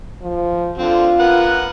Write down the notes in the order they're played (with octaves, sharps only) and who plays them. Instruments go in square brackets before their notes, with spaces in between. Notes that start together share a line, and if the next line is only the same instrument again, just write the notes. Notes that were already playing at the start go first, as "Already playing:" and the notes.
[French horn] F3
[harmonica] D3 C4 [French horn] F4
[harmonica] A#4 B4 F#5